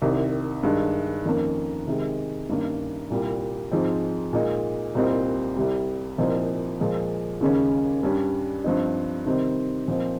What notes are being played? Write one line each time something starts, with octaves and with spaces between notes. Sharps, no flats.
C2 C3 D#3
G2 D#3 G#3
F2 D#3 A#3 C#4
C3 D#3 G#3
G2 D#3 A#3 C#4
C2 A#2 G3
G#2 F3 G#3 C4
A#2 G#3 D#4
C2 A#2 G3 C4 D#4
C2 C3 G3
C2 A#2 F3 C4 D#4
A#2 F3 G#3
D#2 C#3 G#3 C#4
G2 G3 C#4
G2 F3 C4 D#4
C3 D#3 G3 C4 D#4
A#2 F3 C4 D#4